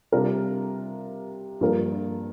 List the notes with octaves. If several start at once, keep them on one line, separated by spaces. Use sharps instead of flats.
C3 G3 D4 F4 A#4
G2 F3 A#3 F4 A#4